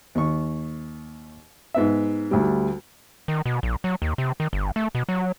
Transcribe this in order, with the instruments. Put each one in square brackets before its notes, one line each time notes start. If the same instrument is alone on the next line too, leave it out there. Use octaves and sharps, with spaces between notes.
[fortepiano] D#2 C#6
G#2 B3 E5
[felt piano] D2 G3
[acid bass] D#3
B2
A#1
F#3
D#2
C3
D#3
G1
A3
B2
F#3